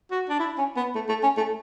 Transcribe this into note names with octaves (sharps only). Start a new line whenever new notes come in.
F#4
D4
E4
C#4
B3
A3
A3
C#4
A3